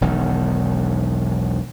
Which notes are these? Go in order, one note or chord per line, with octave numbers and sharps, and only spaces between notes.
E1 B1 D#3